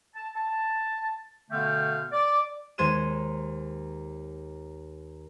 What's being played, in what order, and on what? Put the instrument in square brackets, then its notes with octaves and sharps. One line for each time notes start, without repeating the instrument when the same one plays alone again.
[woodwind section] A5
A5
B2 D3 A3 B3 F5 G5
D5
[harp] D#2 G#3 C5 G#6 D#7 E7